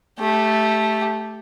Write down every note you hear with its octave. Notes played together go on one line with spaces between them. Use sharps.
A3 G4